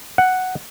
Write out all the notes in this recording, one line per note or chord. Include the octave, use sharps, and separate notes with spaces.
F#5